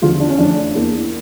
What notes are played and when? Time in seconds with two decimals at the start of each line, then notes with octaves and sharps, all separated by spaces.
0.02 E2 D3 F3 F4
0.20 D4
0.30 C#4
0.38 F2 E3 A3 D4
0.75 E2 E3 A#3